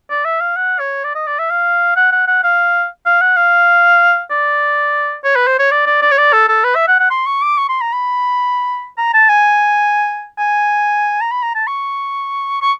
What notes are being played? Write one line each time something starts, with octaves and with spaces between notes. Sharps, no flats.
D5
E5
F5
F#5
C#5
D5
D#5
D5
E5
F5
F#5
F#5
F#5
F5
F5
F#5
F5
D5
C#5
B4
C5
C#5
D5
D5
D5
C#5
D5
A4
A4
B4
E5
F#5
F#5
C6
C#6
D6
C#6
C6
A#5
B5
A#5
A5
G#5
G#5
A#5
B5
A#5
A5
C#6
C#6